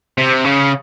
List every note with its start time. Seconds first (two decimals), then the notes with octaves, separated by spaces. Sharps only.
0.18 C3
0.45 C#3